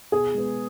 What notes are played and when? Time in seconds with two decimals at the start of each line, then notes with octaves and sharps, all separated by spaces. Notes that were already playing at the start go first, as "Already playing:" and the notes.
0.12 B2 G#4
0.34 G#3 B3